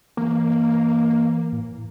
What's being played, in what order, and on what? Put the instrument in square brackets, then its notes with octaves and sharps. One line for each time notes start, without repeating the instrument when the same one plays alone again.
[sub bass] E3 [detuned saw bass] A#3
[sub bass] A2